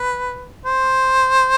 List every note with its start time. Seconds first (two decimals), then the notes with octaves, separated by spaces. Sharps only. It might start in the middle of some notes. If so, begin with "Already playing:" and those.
Already playing: B4
0.66 C5